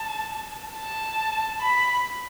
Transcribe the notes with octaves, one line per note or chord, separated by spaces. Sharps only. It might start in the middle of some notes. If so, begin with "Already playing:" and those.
Already playing: A5
A5
B5